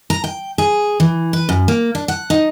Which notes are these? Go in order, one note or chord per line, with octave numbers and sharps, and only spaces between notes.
A#5
G5
G#4
E3
B4
F#2
A#3
D4
F#5
D#4